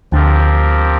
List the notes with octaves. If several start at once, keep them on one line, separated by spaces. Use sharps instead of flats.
D2 D3 F3 C4 G4 A#4